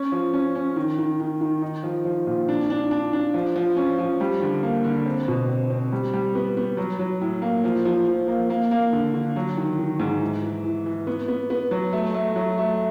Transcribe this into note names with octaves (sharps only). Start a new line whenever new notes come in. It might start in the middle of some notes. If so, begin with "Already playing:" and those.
Already playing: C#4
F3
C#4
C#4
D#3
D#3
D#3
D#3
D#4
F3
F3
A#2
D4
D4
D4
D4
F3
F3
C#4
F3
G3
D3
A#3
D3
C4
B2
C4
C4
G3
G3
B3
B3
F#3
F#3
A2
A#3
F3
F3
F3
A#3
A#3
A#3
D3
D3
F#3
D#3
D#3
G#2
E3
E3
E3
E3
B3
B3
B3
F#3
A3
A3
F#3
A3